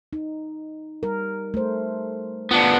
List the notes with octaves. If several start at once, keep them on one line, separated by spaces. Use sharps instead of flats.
D#4
G3 A#4
A3 C5
B3 D4 F4